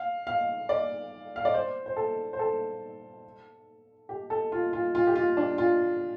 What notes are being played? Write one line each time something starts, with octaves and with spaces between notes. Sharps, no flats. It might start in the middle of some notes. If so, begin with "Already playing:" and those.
Already playing: F5
F5
D5
F5
D5
C5
C5
A4
C5
A4
G4
A4
F4
F4
F4
G4
F4
D4
F4